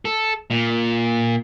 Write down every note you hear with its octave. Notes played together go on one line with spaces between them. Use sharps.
A4
A#2